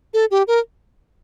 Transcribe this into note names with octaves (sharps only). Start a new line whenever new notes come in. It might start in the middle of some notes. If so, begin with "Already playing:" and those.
A4
G4
A#4